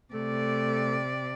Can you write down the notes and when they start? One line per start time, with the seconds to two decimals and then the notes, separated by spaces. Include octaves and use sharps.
0.14 C3 A3 D5